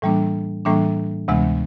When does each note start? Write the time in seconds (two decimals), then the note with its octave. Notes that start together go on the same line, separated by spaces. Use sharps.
0.02 A2 E3 G3 A#3 D4
0.65 A2 E3 G3 A#3 D4
1.28 D2 C3 E3 G#3 B3